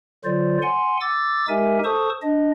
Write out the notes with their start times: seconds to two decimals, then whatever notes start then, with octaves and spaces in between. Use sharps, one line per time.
0.25 D3 F#3 F4 C5 D5
0.62 F#5 G#5 C6
1.00 D6 E6 A6
1.48 G#3 D#4 G4 A#4 E5 G#5
1.85 A4 C5 A5 C#6 D#6
2.22 D4 D#5